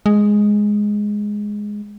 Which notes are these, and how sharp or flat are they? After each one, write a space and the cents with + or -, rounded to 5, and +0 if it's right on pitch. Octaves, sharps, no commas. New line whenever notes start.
G#3 +0